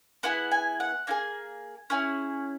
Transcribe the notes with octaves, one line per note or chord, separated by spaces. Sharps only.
B3 E4 G#4 F#5
G#5
F#5
A#3 D#4 G#4 G#5
C#4 E4 G#4